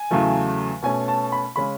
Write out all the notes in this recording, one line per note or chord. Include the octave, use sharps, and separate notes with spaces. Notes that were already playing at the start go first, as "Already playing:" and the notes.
Already playing: G#5
E2 C#3 F#3 A3
B2 A3 C#4 G#5
A5
B5
C#3 G#3 C#4 B5